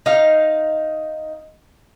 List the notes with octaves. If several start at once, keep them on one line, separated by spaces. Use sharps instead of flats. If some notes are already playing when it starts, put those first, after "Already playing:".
D#4 F5